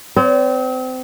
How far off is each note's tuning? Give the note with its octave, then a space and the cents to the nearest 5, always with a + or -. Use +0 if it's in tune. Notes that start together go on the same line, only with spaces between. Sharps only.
C4 -30 C#5 +45